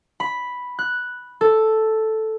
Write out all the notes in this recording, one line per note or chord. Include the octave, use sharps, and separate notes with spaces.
B5
F#6
A4